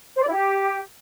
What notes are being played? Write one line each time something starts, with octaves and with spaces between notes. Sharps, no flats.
C5
D5
E4
G4